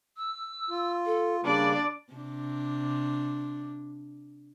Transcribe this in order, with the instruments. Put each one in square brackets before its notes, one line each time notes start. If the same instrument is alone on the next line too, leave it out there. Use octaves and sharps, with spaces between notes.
[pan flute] E6
[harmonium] F4
[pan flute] A4
[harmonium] C#3 G3 A#3 [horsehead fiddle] D4 D5 [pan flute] B5
[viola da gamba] C3 D4